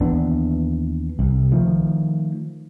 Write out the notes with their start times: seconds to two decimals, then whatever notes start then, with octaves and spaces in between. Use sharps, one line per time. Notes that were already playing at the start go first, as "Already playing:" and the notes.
0.01 D#2 E3 B3 D4
1.19 C2
1.51 D#3 F3 A3